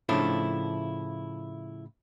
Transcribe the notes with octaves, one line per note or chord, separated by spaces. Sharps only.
A2 C#3 F3 A3 D4 E4